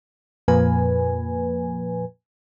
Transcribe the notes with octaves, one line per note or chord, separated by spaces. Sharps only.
F2 A#2 F3 A#3 B4 G#5